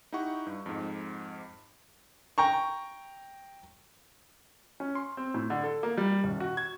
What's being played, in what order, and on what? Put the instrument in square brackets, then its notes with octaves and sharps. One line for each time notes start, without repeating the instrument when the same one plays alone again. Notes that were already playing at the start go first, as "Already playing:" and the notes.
[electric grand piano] D#4 E4 G4 F#5 C#6
G2
F2 G#2
[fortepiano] G5 A#5 C#6
[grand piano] C#4
C6
C4
A2
D3
A4
A#3
G3
D#1
F#4
G#6